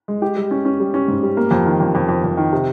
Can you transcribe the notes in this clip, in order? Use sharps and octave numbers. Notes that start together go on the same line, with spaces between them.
G#3
G4
G3
C#4
C#4
G3
C#4
G#2
G3
A#3
F2
D#3
F2
F2
F2
F2
D#3
C3